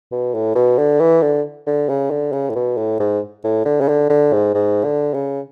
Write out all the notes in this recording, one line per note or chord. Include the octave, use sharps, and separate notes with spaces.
B2
A2
B2
D3
E3
D3
D3
C#3
D3
C#3
A2
B2
A2
G#2
A2
D3
C#3
D3
D3
G#2
G#2
D3
C#3